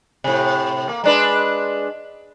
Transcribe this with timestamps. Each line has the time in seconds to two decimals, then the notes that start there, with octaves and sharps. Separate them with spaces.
0.24 A2 C3
0.89 A#3
1.04 G#3 D4 B4